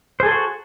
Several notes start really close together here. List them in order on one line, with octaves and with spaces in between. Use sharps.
C5 G#4 A4 C6 F#4